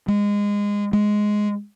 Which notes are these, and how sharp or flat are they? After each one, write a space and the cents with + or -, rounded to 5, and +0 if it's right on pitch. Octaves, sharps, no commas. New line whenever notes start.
G#3 -20
G#3 +5